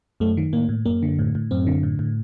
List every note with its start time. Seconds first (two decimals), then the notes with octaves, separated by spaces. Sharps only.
0.20 F#2 A3
0.37 D#3
0.53 A2 A#3
0.69 A2
0.86 F#2 A#3
1.03 D3
1.19 A2
1.35 A2
1.51 F#2 C4
1.67 D3
1.83 A2
1.99 A2